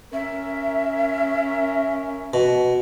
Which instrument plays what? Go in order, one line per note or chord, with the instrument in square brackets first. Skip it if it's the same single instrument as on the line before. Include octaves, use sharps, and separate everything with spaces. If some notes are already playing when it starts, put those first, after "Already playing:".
[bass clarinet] C#4 [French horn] A#4 [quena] E5
[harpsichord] B2